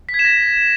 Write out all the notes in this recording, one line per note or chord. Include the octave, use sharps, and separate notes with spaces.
B6
G#6
E7
A#6